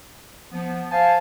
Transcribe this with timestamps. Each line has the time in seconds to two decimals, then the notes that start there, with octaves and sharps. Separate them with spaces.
0.52 F3 B3
0.91 C5 F5 G#5 A5